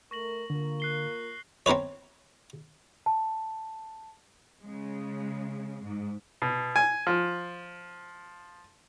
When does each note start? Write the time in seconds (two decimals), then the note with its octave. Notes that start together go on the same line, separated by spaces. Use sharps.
0.11 A3 A#4 C#6 A#6 F#7
0.50 D3 A#3 F4 A#4
0.80 F#6 C7 G7
1.66 C4 C#4 A#4 B4 C#5
3.06 A5
4.61 C#3 G#3
5.83 G#2
6.42 B2
6.76 G#5
7.07 F3